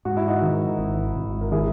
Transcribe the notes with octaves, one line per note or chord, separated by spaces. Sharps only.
G#2 F#4
E4
D#4 F#4
D#3
G#1
G#1
A#4
D#3 E4 G#4